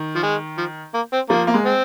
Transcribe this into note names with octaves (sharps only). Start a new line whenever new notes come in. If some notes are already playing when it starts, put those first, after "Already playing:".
Already playing: D#3
F3
G#3
F3
A#3
C4
F3 A#3
A#3
G#3
C4